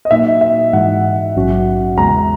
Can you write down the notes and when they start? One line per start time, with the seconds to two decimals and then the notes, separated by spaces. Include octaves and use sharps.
0.05 D#5
0.11 A#2 F#3 A#3 D#4 F#4 E5
0.41 E5
0.73 G#2 E3 G#3 D#4 F#4 F#5
1.35 A#1 G#2 F#3 C#4 F#4
1.97 E2 C#3 G#3 A#5